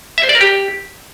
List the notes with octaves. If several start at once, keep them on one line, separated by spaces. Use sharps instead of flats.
E5
C5
D5
A#4
G4